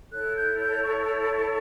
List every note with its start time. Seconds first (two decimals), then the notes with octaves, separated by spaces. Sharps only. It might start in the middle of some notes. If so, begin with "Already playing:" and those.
0.12 E4 A4 C#5 F#6
0.36 G6
0.59 G6
0.83 C#6
1.22 B5
1.31 C#6